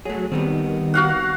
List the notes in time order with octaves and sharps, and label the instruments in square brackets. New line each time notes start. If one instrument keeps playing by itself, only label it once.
[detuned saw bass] F#3 [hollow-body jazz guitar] A3 G#4
[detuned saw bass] D#3 [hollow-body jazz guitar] G3 B3 C4
[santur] F#4 F5 F#5